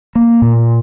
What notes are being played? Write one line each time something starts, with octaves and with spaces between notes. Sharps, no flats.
A#3
A#2